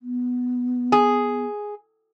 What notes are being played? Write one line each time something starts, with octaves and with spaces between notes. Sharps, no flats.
B3
G#4